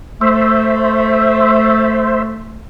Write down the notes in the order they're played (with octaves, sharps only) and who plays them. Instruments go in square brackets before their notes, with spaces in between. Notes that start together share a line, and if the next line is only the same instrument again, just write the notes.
[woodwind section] A3 [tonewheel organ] C5 E5